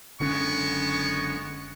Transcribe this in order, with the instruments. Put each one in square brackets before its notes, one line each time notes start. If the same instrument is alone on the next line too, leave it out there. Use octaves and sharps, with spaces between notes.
[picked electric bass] F#1 D3 C#4 [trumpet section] G#3 B3 C#6